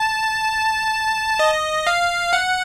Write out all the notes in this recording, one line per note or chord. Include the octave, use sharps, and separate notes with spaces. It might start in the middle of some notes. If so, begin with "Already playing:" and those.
Already playing: A5
D#5
F5
F#5